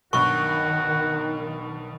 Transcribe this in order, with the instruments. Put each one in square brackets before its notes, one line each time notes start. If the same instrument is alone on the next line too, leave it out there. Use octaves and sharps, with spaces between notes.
[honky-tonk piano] B1 G2 B2 [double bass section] D#3 [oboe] F#4 [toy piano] C#6